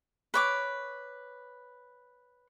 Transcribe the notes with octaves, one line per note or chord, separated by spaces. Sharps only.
B4 C#5 D6